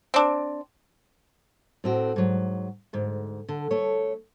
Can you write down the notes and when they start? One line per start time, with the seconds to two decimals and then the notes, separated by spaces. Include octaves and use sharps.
0.14 C4 D4
1.84 A2 C4 F#4
2.16 G#2 F#3
2.93 D2 G#2
3.49 D3
3.71 A3 C#5